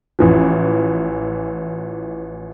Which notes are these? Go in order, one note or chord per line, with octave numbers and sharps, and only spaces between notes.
A1 E3 F3